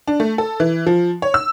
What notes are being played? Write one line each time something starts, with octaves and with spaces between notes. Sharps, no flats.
D4
A3
A4
E3
F3
C#5
E6